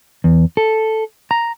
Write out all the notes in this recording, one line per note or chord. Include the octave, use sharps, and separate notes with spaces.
E2
A4
A#5